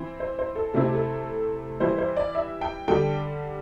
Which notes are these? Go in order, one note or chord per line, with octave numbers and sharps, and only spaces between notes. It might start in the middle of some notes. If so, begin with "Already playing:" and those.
Already playing: E3 C4 E4
C5
C5
A4
C3 A3 C4 E4 A4
G4
A4
E3 G3 E4 C5
C5
D5
E5
G5
D3 G3 D4 G5